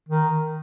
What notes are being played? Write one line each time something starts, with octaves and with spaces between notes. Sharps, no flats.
D#3